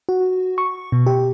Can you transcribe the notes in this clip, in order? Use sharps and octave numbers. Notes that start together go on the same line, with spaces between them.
F#4
C#6
B2
G4